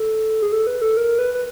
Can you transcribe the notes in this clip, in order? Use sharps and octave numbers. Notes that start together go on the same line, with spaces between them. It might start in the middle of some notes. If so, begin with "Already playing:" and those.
Already playing: A4
G#4
A4
B4
A4
A#4
B4
B4